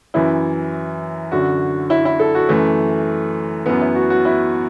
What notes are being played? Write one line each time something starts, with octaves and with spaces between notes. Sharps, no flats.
F#2 E3 E4
F#2 D3 F#4
E4
E4
A4
F#4
F#2 E3 A3
F#2 E3 B3
E4
F#4
F#4
E4